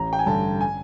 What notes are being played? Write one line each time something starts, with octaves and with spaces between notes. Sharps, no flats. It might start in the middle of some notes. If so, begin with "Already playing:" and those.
Already playing: A1 A#5
G5
G#5
G2 D3 A5
G#5